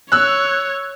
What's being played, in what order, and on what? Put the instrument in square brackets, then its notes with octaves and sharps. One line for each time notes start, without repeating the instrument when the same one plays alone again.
[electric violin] C#5 [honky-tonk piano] E6 F#6